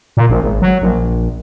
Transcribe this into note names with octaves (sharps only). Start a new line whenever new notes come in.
A#2
A#1
G#1
F#3
A#1